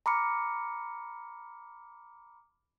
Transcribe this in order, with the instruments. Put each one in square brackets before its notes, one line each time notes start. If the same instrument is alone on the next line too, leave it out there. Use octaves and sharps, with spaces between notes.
[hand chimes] A#5 B5 D6 F6 C#7